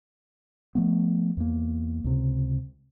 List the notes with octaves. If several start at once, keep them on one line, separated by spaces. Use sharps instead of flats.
F3 A3 B3
E2 A#3
C#2 C3